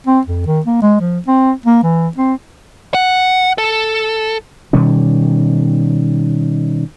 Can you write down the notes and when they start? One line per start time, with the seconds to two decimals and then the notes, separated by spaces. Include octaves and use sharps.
0.07 C4
0.27 F2
0.46 D#3
0.66 A#3
0.82 G#3
1.00 F3
1.27 C4
1.66 A#3
1.83 E3
2.17 C4
2.94 F#5
3.58 A4
4.73 B2 D#3 G3 C#4